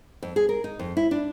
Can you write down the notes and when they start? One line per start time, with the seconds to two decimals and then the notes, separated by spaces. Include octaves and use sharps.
0.23 F2
0.36 G#4
0.49 A#4
0.64 D#4
0.79 F2
0.97 E4
1.11 D4